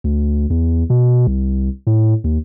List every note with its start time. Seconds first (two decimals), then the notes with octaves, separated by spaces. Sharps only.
0.04 D2
0.50 E2
0.90 B2
1.27 C2
1.87 A2
2.24 D#2